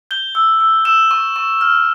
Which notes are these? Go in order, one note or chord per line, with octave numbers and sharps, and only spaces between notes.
G6 G7
E6
E6
E6 E7
C#6
C#6
F6